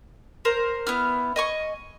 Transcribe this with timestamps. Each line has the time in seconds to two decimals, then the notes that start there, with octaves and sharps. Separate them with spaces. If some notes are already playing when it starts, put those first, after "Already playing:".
0.45 A#4 C5
0.87 B3 E4 F6
1.36 D#5 G#5 C#6